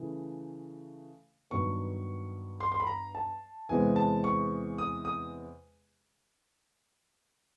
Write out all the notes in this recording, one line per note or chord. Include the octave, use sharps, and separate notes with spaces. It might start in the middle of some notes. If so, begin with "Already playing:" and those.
Already playing: C#3 E3 A3
G2 D#3 F#3 B3 C#6
C6
C6
B5
A#5
A5
E2 C3 E3 G#3 B3 G#5
A5
C#6
D#6
D#6